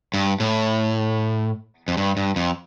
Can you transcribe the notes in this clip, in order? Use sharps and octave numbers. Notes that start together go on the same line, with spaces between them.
G2
A2
F2
G2
G2
F2